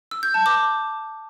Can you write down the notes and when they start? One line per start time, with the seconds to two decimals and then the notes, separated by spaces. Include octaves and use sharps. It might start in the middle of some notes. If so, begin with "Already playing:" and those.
0.11 E6
0.23 G6
0.34 A5
0.46 D6